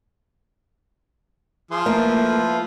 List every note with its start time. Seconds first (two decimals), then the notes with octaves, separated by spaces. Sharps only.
1.71 F3 G#4 C6
1.86 A3 A#3 E4 F4 B4